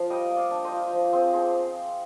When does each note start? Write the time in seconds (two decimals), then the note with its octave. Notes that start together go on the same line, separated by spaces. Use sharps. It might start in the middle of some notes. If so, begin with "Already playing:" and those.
Already playing: F3 F4 F5
0.10 G3 D#5 G5
0.30 A#3
0.37 D5 F5
0.51 D4
0.64 C5 D#5
0.72 F4
0.92 F3
1.12 C4 G#4 C5
1.33 D#4 G#4 C5